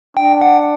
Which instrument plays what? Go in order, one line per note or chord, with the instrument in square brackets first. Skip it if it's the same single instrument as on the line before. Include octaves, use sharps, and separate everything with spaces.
[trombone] D4 [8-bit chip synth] G5
[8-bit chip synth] F#5